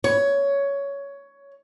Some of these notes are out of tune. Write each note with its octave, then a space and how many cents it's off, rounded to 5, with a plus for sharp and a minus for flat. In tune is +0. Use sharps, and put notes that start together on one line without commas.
C#5 +15